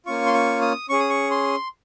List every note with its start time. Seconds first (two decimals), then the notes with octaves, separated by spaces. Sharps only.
0.06 A#3 C#4 F4 C#6
0.26 C6
0.34 C#6
0.61 D#6
0.89 C#4 G#4 C#6
1.00 D#6
1.10 C#6
1.31 C6